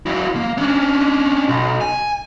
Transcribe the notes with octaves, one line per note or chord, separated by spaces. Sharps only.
F#3 E4
A#3
C#4 D4
B1
G#5